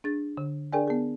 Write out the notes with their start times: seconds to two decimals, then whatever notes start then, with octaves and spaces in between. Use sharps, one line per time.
0.04 D4 G#4 A6
0.37 D3
0.72 D4 G#4 A#4 D5 G5 G#5
0.88 B3 G#4